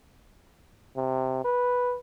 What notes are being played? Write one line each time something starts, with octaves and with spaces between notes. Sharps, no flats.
C3
B4